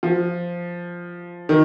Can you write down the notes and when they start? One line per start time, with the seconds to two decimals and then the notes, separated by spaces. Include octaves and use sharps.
0.03 F3
1.49 D#3